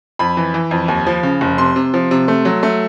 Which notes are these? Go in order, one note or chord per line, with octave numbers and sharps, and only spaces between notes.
F2 B5
E3
E3
F2
D#2
F3
C#3
F1
C3 C6
C3
F3
C3
A3
F#3
A3